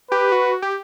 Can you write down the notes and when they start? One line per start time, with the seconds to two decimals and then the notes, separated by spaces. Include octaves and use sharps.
0.11 G4 B4
0.32 F#4
0.62 G4